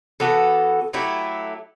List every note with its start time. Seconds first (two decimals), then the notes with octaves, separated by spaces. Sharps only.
0.20 E3 B3 F#4 A4
0.93 F#3 A3 E4 G4